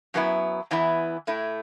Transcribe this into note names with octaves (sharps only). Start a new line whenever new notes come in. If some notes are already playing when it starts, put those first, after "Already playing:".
F#2 F#3 B3 E4
E2 E3 B3 E4
A2 A3 E4